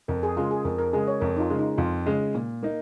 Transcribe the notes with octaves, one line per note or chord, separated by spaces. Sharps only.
F2 A#4
G#4
C#3 G#3 F4
G#4
F2 A#4
A#4
C#3 G#3 G#4
C#5
F2 A#4
D#4
F4
C#3 G#3
D#4
F2 F4
C#3 G#3
A#2
A#3 D#4